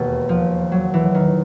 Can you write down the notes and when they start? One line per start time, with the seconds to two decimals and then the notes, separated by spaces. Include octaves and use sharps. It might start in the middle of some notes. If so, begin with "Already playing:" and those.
Already playing: E1 D#2 B2
0.29 F3
0.72 F#3
0.94 E3
1.15 D#3